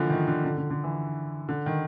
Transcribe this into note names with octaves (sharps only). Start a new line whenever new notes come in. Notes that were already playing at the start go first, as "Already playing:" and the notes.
Already playing: D3 E3 F3 A#3
D#3
D3
D3
D3
D3
E3
D3
D#3